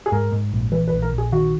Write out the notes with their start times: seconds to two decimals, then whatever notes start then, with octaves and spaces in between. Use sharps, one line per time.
0.06 G#4
0.12 G#2 A#4
0.33 G#2
0.53 A#1
0.72 E3 B4
0.88 B4
0.92 A#1
1.02 A#4
1.13 A#1
1.18 G#4
1.32 D#3 F#4